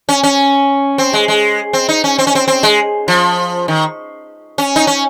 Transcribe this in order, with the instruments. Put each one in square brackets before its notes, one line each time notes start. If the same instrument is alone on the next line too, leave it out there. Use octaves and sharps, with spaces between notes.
[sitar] C#4
C#4
C4
G#3
G#3
C4
D#4
C#4
C4
C#4
C4
C4
G#3
F3
D#3
C#4
D#4
C#4